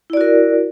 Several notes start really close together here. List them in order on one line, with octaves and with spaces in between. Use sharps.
E4 D5 F#4 A#4